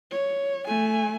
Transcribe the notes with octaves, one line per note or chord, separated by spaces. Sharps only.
C#5
A3 G#5